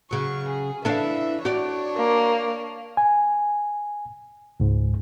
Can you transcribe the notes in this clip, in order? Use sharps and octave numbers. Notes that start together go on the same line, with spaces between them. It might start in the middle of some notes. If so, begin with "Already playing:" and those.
C#3 F#3 C#6
G#4
E3 D4 E4 A4 E5 F5
D4 F#4 G4 C#5 D5
A#3
G#5
C#2 G#2